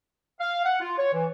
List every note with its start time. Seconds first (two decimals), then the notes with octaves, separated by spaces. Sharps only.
0.40 F5
0.65 F#5
0.81 F4
0.98 C#5
1.13 E3